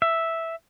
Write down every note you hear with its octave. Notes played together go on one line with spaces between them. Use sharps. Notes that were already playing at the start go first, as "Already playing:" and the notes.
E5